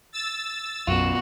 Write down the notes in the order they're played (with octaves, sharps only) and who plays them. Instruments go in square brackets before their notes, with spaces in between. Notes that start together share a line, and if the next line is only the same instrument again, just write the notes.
[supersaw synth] E6 A6
[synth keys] B1 F#2 E7 [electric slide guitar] B2 F4 [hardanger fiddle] F#4